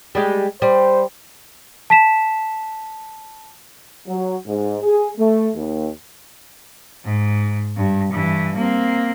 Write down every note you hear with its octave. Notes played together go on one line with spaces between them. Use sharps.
G3 G#3 G4
G3 C5
A5 B6 E7
F#3
G#2
G#4
A3
D#2
G#2
G2
G2 E3
A#3 C4